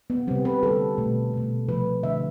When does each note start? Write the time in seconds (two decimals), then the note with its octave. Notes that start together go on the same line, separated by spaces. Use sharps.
0.10 B3
0.27 C3 G3 C4
0.45 B4
0.63 D3 G3 A4
0.98 B2 A3
1.33 B2 A3
1.68 C3 F3 A3 B4
2.03 D3 A3 E5